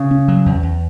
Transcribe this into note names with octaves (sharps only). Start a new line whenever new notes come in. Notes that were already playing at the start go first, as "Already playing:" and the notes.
Already playing: C#3
C#4
F#3
E2
E2